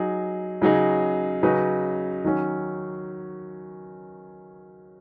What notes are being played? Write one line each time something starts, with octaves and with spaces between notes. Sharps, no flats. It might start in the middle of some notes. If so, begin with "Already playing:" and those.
Already playing: F#3 D#4 G#4
C#3 F#3 D#4 G#4
C#3 F#3 D#4 B4
D#3 F#3 C#4